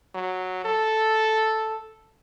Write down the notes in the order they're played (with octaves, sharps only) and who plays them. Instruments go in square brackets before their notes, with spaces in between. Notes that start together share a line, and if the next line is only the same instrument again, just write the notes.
[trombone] F#3
A4